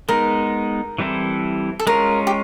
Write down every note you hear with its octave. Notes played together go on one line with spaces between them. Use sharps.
G#3 B3 D#4 A#4
E3 G3 C4 E4 A4
A4
G#3 C#4 F4 A#4
G4